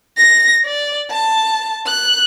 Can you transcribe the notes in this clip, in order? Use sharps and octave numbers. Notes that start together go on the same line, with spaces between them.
A#6
D5
A5
F#6